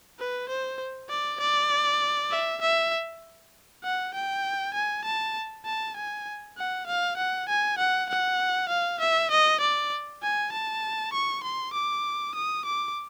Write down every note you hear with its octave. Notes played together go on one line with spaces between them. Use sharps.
B4
C5
D5
D5
E5
E5
F#5
G5
G#5
A5
A5
G#5
F#5
F5
F#5
G#5
F#5
F#5
F5
E5
D#5
D5
G#5
A5
C#6
C6
D6
D#6
D6